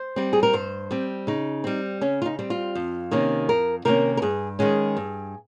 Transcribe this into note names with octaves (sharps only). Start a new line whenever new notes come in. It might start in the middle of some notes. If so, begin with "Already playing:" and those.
Already playing: C5
G3 C4
G#4
A#4
G2 C5
G3 C4
C#3 D#4
G3 C4
C#3 C#4
F4
D#4
G3 C4
F4
F2
C3 D#3 A#3 C#4
F2 A#4
C3 D#3 A#3 C#4 A#4
A#4
G2 G#4
D#3 G#3 C#4 G#4
G2